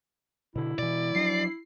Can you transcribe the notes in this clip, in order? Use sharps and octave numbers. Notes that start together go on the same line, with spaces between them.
B2 D3 E4
B2 E3 D5
F3 F#3 D4 C7